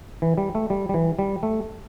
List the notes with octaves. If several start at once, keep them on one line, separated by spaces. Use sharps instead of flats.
E3
G3
A3
G3
G3
E3
G3
A3